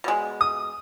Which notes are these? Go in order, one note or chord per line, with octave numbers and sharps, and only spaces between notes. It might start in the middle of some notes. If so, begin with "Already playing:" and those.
B2 G#3
D#6